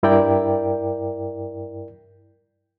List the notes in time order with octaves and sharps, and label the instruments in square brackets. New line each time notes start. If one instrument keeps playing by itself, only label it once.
[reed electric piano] G2 E4 A#4 D5 G5